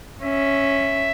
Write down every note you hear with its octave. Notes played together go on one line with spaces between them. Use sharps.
C#4 E5